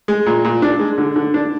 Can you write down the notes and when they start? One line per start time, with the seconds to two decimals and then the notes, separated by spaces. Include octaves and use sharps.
0.08 G#3
0.26 A#2
0.44 A#2
0.62 D4
0.79 G#3
0.98 D3
1.16 D3
1.34 D4